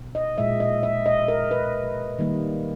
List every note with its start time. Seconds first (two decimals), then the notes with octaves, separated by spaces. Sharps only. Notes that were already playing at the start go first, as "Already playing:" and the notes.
Already playing: B2
0.15 D#5
0.38 A#2 G#3 E5
0.60 D#5
0.83 E5
1.06 D#5
1.28 A#4
1.51 B4
2.19 D#3 G3 A#3